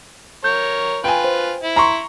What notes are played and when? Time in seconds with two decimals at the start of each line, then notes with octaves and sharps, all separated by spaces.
0.44 A#4 C#5 G6
1.04 F4 B4 G5 G#5
1.24 C5
1.63 E4
1.76 A#5 C6 C#6